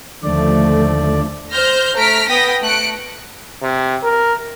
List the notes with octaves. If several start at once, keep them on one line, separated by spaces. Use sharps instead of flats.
D#2 D3 F3 A3 D5
C5 F6 G6 A#6
A3 A#5 F6 B6 D7
B3 G5 D#6 A#6 B6
A3 F#6 C#7 D7
C3
A#4